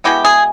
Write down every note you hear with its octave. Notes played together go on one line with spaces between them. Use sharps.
B2 G#3 B3 E4 G4
G#4